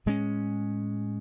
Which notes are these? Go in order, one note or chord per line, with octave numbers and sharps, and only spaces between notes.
A2 G#3 C#4